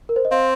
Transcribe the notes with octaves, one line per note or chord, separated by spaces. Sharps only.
A#4
C5
D#5
C4 F5